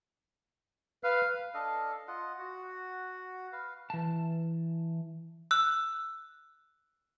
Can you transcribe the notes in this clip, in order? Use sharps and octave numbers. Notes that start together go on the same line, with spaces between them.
B4 F5
D4 A4 D#5 F5
F4 D#5 F#5
F#4 F#5
B4 F5
E3 A5
E6 F#6